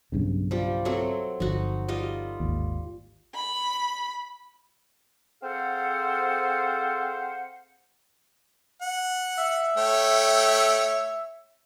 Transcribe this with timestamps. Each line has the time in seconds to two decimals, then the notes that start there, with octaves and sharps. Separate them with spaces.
0.12 B1 G2 C#3
0.51 F3 G3
0.85 F#3 A3 C4
1.40 G1 F3 D#4 F#4
1.88 G3 F4 D#5
2.40 G#1 D#2
3.34 B5
5.42 C4 G#4 A4 C5 F5 F#5
8.82 F#5
9.38 E5
9.77 A3 C#5 G5